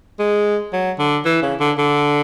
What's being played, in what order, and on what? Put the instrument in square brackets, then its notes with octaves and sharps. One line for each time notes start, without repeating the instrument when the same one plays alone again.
[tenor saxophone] G#3
F#3
D3
E3
C#3
D3
D3